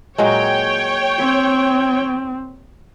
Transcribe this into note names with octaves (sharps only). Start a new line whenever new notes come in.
A#2 F#3 G#3 C#5 G5
C4